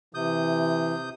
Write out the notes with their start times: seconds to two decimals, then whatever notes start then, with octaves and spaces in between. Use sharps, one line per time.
0.14 C3 E3 D#6 G6